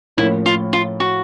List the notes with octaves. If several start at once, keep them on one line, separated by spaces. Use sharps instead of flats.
A2 F3 A#3 C#4 E4
F4
F4
F#4